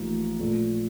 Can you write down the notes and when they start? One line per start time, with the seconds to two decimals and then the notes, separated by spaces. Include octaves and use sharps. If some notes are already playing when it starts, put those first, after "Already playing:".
Already playing: A1 A2 F3 A#3 D#4
0.39 A#2 F3 A3